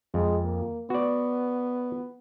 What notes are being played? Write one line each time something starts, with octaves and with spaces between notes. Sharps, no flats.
F2 G#3
A#3
B3 F#4 D5